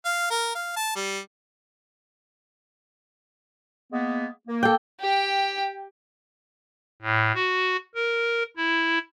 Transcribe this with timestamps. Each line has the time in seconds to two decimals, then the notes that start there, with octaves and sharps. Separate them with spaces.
0.05 F5
0.31 A#4
0.55 F5
0.76 A5
0.96 G3
3.92 G#3 A#3 B3
4.48 A#3
4.63 A4 G5
5.00 G4 G5
7.02 A2
7.35 F#4
7.95 A#4
8.57 E4